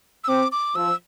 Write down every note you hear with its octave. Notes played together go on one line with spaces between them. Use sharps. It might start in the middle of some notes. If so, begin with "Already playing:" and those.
E6
C4 D6
D6
F3 E6